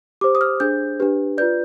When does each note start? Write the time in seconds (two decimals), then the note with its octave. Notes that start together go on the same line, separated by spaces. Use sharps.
0.21 G4 C5 D6
0.35 D#6
0.41 F6
0.60 D4 G#4 C5 G6
1.00 D4 G4 B4
1.38 F4 B4 D5 G6